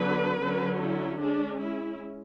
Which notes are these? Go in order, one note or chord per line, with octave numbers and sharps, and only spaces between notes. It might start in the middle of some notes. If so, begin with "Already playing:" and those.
Already playing: D3 F#3 B3 D4 B4
D3 F#3 C#4
E4
G#3 C#4 D4
E4